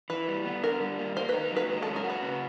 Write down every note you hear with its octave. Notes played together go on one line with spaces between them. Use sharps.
E3 B4
G3
B3
D3 A#4
G3
A#3
A#3 C5
B4
D#4
F#3
B4
G#3
A4
C#4
A#4
F#4
B4
C#3